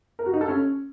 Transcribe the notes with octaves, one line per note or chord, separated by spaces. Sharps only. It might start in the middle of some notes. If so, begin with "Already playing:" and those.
A#4
F#4
D#4
A4
C#4